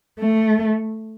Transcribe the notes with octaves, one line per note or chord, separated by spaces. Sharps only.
A3